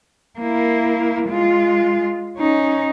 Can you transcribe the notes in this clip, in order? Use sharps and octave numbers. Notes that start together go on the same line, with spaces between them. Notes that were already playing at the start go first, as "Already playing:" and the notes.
A#3 E4
G#3 F4
C#4 D#4